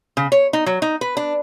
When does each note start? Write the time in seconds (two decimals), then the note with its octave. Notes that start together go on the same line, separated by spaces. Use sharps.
0.17 C#3
0.32 C#5
0.53 D#4
0.66 F#3
0.82 D#4
1.01 B4
1.17 D4